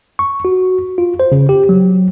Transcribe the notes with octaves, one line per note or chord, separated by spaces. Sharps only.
C#6
F#4
F4
C5
C#3
G4
F#3